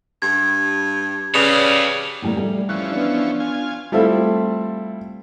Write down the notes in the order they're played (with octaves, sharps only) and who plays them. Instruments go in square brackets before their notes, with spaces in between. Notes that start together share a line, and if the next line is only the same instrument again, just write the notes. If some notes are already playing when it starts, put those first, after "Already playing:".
[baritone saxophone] G2 [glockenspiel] G#6
[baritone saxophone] C#3 [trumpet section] G4 B4 D5 [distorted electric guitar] A4 F5 [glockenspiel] F7
[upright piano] A2 G3 A#3
G3 A3
[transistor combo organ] E3 F3 C#4 [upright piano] F#6
[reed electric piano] B3 D4
[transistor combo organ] F4 G#5
[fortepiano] G3 A3 C4 E4 F4 A4